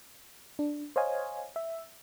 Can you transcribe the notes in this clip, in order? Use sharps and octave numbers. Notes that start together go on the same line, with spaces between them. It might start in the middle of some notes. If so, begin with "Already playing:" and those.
D4
C5 C#5 D#5 F5 G#5
E5